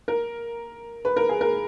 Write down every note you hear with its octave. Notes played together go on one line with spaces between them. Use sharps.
A#4
B4
A#4
G#4
A#4